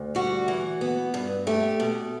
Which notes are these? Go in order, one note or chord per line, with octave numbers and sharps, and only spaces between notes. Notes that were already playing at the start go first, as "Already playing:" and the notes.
Already playing: D2
G3 F#4
E3
B3
G2
A3 G4
B2